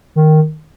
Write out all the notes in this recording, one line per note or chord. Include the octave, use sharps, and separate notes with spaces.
D#3